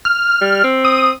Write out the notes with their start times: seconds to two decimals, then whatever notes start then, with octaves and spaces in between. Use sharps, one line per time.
0.05 F6
0.41 G3
0.64 C4
0.85 D#6